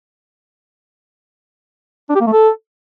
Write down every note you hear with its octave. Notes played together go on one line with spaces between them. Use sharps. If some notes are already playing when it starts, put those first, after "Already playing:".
D4
G4
A#3
A3
A4